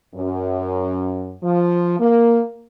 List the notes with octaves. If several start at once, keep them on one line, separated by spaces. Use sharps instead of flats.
F#2
F3
A#3